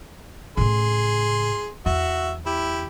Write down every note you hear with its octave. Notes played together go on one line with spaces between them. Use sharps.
A2 C#3 G#4 C6
E2 F#4 E5
E4 G4